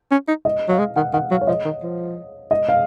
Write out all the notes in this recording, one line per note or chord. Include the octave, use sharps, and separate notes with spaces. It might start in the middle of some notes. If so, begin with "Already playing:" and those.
C#4
D#4
D#5
F#3 F5
G#3
D#3 F#5
D#3 F#5
F#3 F5
C#5
F3 D#5
D#3
F3
D#5
F5